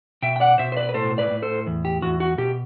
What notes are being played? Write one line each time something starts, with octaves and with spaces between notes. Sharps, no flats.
B2 E5 G5
G5
D5 F#5
B2 C5 E5
C5
B4 D5
B4
A2 A4 C5
B4 D5
A2
A4 C5
E2
G4
E2 F#4
F#4
B2 G4